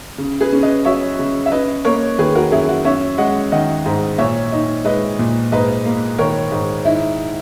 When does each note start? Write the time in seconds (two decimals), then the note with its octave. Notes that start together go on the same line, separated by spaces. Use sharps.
0.18 C#3
0.41 G#4 B4
0.53 C#4
0.63 B4 D#5
0.85 F#3 C#5 E5
1.19 C#3
1.46 E5
1.51 C#4 B4 D#5
1.85 A#3 A#4 C#5
2.18 D#3 G#4 B4
2.35 F#4 A#4
2.51 F#2 E4 G#4
2.69 F#4
2.85 C#4 C#5 E5
3.18 G#3 D#5 F#5
3.52 D#3 D#5 F#5
3.86 G#2
4.18 A#2 C#5 E5
4.52 D#4
4.85 G#3 B4 D#5
5.19 A#2
5.52 G#2 B4 D#5
5.86 A#3
6.18 D#3 A#4 C#5
6.52 G#2
6.85 D#4 E4